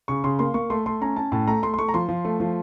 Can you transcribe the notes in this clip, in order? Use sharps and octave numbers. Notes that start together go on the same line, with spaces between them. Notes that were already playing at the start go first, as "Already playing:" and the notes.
C#3 C#6
C#3 C6
A#3 C6
A#3 C#6
A3 C6
A3 C6
C#4 A#5
C#4 A5
A2 A5
A3 A#5
A3 C6
C6
A3 C#6
A#5
F3 C6
F3
A3
F3